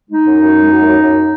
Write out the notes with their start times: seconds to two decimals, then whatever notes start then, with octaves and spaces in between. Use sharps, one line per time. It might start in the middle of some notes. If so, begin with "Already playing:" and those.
0.10 G#3 D#4
0.26 F#2
0.41 F#2
0.55 G#3
0.71 F#2
0.86 F#2
1.01 F#2